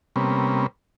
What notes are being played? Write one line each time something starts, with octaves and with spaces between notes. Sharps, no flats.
C3 G3 A#3 B3 C#4